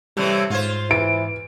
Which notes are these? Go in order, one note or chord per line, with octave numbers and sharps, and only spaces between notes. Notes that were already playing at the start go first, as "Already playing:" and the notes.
A2 C3 E3 G3
G#2 F4 C5 G#6
E3 D7